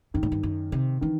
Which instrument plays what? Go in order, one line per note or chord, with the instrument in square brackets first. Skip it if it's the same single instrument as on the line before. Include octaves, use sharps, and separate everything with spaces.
[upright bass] G2 [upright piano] D#3
[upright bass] A2
G2
F#2
C3
[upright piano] D#3 [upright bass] E3